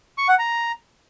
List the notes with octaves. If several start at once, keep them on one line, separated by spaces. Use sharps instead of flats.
C#6
F#5
A#5